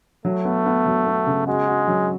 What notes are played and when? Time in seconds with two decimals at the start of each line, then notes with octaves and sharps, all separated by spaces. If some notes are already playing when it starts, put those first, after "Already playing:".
0.25 F#3 A3
0.45 B3
0.66 B3
0.86 F#3
1.07 B3
1.26 C#3
1.47 G#3 F#4
1.68 F#4
1.88 F#3